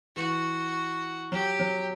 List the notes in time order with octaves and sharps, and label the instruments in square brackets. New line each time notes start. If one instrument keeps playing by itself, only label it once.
[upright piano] E3 [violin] F#4
[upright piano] F#3 [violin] G4
[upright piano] F#3